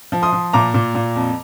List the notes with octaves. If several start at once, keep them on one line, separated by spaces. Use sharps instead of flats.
F3
C6 D#6
F3
A#2 A#5 D6
A#2
A#2
F2